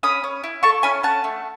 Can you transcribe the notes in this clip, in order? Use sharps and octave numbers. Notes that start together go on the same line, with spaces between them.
C#4 B5 D#6
C#4
E4
A4 A5 C#6
C#4 G#5 B5
C#4 F#5 A5
A3